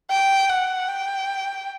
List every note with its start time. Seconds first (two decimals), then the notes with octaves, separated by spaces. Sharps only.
0.11 G5
0.49 F#5
0.88 G5